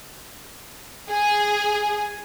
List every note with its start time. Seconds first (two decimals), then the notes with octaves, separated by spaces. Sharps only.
1.09 G#4 G#5